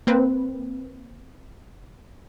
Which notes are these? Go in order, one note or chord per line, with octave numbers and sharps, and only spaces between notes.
A#3 C4 B4